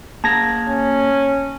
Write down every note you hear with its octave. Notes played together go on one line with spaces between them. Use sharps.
A#3 G#4 A5 A#5 G#6 A#6
C#4